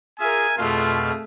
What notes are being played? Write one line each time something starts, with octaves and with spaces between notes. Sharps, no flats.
F4 G#4 A#4 E5 G#5
F2 B2 A3 F4 G#4 F5